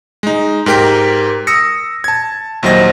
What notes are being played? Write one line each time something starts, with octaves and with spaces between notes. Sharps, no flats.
G#3 D#4
G#2 G4 A#4 G5 B6
D#6 E6 A#6 C#7
A5 G#6
A#1 D#2 F#3 C5 D#5 A#6